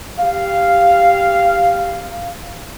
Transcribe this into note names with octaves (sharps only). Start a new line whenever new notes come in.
G4 F5